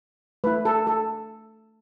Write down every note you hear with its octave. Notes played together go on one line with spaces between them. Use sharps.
A3 E4 B4
A4
A4